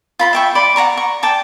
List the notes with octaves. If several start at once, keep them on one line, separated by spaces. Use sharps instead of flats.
F4 B5 C6
E5 G5 C#6
D5 B5 C6
F#5 A5 A#5 C#6
C#6
D5 G5 A5